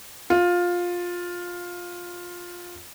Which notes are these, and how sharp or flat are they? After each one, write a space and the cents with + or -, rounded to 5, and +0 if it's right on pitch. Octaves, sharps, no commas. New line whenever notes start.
F4 +15